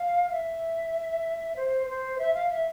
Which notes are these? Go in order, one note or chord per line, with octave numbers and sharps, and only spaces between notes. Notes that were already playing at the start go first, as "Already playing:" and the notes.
Already playing: F5
E5
C5
C5
E5
F5
E5